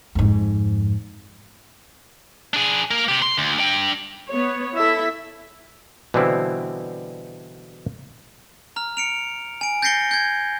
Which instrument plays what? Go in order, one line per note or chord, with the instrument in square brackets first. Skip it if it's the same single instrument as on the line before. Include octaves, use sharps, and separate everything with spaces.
[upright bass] F2 G#2
[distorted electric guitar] D4 G#4
A#3 A#4
C3 G4
C6
D2
D4 G5
[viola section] B3 C#5
E4 A4 E5
[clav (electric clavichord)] B2 D3 E3 G3 C4 E4
[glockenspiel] A#5 F6
C#7 D7 F7
G#5 D7
G6 A6 A#6 C7 C#7 G7
G6 G#6